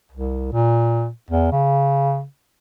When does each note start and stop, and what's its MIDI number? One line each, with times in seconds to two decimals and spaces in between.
0.12 0.48 36
0.53 1.09 46
1.31 1.48 40
1.51 2.24 49